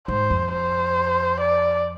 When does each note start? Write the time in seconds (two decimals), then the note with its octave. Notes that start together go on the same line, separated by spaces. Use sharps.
0.08 G#2 C5
0.30 F2
0.53 C5
1.40 D5